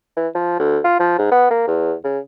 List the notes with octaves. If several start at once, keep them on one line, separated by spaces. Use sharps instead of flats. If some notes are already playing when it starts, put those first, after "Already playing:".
E3
F3
D2
F4
F3
G#2
B3
A#3
E2
C#3